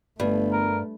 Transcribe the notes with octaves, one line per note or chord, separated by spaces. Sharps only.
G1 G2 A3
A#4